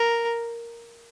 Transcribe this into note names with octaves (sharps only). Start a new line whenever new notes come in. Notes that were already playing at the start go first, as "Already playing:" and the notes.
Already playing: A#4